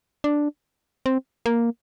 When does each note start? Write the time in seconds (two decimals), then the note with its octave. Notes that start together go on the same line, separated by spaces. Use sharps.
0.24 D4
1.06 C4
1.46 A#3